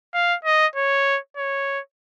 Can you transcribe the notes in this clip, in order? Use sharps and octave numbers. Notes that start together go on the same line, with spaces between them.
F5
D#5
C#5
C#5